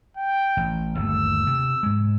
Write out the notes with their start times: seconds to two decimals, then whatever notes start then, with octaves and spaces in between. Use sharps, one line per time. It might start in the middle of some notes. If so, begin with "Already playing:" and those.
0.17 G5
0.57 A1
0.96 G1 D#2 A3 E6
1.47 C3
1.83 G#2 G#3